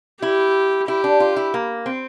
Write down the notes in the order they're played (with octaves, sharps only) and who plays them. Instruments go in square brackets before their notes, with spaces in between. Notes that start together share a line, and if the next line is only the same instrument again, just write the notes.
[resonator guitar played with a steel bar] E4 [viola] G4
[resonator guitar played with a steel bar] E4 [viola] G4
[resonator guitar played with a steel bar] D4
F4
E4
A#3
C4